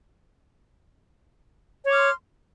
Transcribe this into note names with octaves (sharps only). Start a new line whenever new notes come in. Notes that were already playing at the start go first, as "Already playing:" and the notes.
C#5 C6 D6 F6